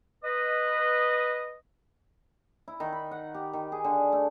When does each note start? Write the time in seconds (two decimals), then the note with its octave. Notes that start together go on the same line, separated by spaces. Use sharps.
0.24 B4 D#5
2.68 E4
2.80 D#3
2.93 B5
3.11 F#5
3.34 G4
3.53 D#3
3.72 G#4
3.84 D3
4.12 A3